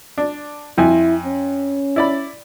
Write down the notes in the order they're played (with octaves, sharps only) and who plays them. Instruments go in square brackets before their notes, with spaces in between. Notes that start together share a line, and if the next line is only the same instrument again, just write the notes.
[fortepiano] D4
[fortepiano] F2 G#5 [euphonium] E4
[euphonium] C#4
[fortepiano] E4 D5 B5